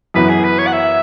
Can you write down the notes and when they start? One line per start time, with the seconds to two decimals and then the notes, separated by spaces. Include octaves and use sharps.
0.14 F#2 E3 B3 F#4 B4
0.29 G#4
0.44 B4
0.59 C#5
0.67 F#5
0.73 E5